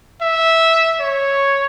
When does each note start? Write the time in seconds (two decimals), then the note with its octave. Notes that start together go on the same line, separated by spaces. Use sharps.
0.21 E5
1.00 C#5